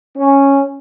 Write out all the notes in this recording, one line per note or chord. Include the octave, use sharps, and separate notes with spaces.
C#4